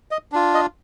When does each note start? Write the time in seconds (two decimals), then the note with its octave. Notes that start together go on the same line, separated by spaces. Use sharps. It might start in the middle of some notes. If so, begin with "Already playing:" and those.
0.11 D#5
0.32 D4 F4
0.54 D#5